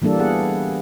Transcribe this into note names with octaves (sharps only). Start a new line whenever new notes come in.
E3 G3 A#3 D4 A4
B3 G#4 F#5